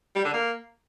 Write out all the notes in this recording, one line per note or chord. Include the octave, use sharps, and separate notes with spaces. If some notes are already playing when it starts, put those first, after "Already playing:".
G3
D3
A#3